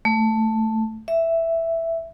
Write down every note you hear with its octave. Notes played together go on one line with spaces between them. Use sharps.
A3
E5